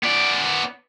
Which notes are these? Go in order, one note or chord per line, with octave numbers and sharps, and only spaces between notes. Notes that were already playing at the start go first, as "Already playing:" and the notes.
B3 D5